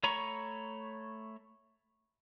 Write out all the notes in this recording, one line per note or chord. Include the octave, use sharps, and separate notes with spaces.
A3 C#5 A#5 B5 C#6